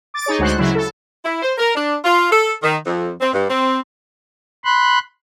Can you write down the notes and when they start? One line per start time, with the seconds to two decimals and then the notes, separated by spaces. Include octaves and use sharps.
0.14 D6 A6
0.26 D#4 G#4 C#5
0.39 D2 G#3 F#4 C5 F#6
0.58 C#3 F#3 E4
0.75 A4
1.25 E4
1.43 C5
1.58 A#4
1.75 D4
2.04 F4
2.31 A4
2.63 D#3
2.85 F2
3.21 C4
3.33 G2
3.50 C4
4.64 B5 C6 F#6